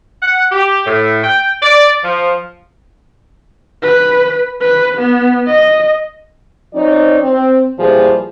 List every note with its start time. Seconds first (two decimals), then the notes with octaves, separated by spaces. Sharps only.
0.22 F#5
0.52 G4
0.86 A2
1.24 G5
1.62 D5
2.04 F3
3.82 B4
4.61 B4
4.98 B3
5.47 D#5
6.74 F3 C4 D#4 C#5 D5
7.22 C4
7.79 A#2 E3 F3 G3 G#4